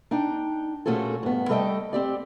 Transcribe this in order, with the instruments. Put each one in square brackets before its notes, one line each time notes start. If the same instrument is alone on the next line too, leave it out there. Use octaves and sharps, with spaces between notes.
[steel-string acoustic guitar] D4 D#4 G5
A#2 A3 C#4 F#4 G#4 A4
G2 B3
G3 A3 A4 D#5 E5 G5
C4 G4 D5